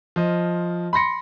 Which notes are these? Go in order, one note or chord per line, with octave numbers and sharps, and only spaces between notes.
F3 D#5
B5 C6 A#6 C#7